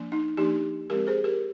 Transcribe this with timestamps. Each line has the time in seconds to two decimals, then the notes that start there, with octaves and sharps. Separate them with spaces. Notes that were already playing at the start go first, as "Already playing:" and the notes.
Already playing: F3 A#3 D4
0.12 D#4
0.37 F3 A#3 D4 D#4 G4
0.89 F3 G#3 C4 G4 A#4
1.07 G#4 C5
1.24 G4 A#4